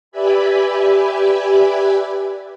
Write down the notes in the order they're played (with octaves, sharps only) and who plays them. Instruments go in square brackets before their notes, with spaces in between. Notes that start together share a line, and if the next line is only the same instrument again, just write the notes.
[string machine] G4 B4 D5 E5 G#5 B5